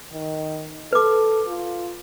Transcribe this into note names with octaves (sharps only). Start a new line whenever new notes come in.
D#3
A4 B4 D6
F4